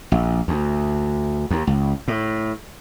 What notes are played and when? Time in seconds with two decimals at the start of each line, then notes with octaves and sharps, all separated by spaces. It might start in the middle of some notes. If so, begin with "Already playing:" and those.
0.12 A#1
0.48 D2
1.51 D#2
1.67 C#2
2.08 A2